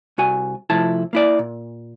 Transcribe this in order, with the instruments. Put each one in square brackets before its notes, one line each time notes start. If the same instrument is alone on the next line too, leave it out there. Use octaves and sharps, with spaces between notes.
[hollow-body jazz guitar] C2 F#4 G#5
C3 F3 A3 E4 A5
A#3 E4 D5
A#2